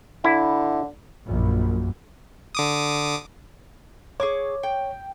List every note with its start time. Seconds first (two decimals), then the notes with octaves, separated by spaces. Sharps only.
0.25 D3 E4
1.27 A#1 F#2
2.55 D3 D6 D#6
4.20 G#4 C#5 C#6 D6
4.63 G5